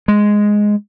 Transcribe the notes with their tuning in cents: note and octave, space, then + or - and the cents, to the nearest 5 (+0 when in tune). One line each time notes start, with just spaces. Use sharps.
G#3 +0